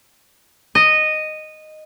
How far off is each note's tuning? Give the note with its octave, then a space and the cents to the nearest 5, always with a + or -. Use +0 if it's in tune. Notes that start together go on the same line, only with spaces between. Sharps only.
D#5 -10